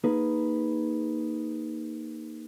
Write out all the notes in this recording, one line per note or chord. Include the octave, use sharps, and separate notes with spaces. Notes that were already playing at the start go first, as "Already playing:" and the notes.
A#3 D#4 G#4 B4